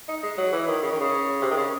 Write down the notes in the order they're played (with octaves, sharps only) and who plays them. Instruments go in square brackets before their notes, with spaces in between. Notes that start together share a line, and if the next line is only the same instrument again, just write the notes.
[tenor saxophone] D#4
G#3
F#3
E3
D#3
C#3
D#3
C#3
C3
D#3
C#3